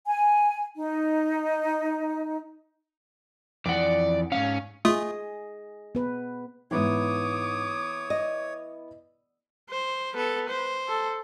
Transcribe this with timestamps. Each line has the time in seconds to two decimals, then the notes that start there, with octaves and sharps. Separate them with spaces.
0.06 G#5
0.78 D#4
3.66 F2 E3 D5 F#5
4.32 G#2 G3 C#4 F5
4.85 A3 F4 G#4 D#5 D#6
5.95 B3 B4
6.71 E2 G#2 E3 B3 E4 C#5 D6 D#6
8.10 D#5
9.70 C5
10.14 B3 A4 B4
10.50 C5
10.88 A4